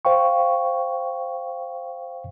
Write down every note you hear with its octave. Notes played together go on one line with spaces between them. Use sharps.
C5 F5 G5 C#6